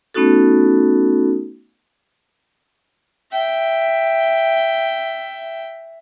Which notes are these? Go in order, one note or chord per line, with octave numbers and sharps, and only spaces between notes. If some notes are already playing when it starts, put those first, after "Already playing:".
A3 B3 C#4 D#4 F#4 A4
E5 G5